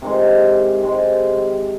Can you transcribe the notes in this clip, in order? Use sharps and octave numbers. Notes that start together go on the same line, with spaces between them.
C3 D#3 G#3
C3 D#3 G#3